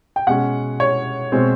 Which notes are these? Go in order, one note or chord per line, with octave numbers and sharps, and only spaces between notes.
G5
B2 G#3 C#4 F#5
C#5
B2 G#3 C4